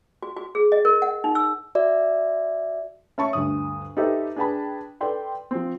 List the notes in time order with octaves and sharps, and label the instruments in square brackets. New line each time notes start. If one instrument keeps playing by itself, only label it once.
[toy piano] F#4
F#4
G#4
D#5
A#4
F#5
D#4
E6
[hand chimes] F#4 D5 E5
[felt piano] C#4 E5 A5 B5 C#6
D2 G2 D#6
D#4 G4 A4 B4 C5 E5
D4 G#4 B4 G5 A5 B5
A4 B4 D5 G5 C6
F3 C4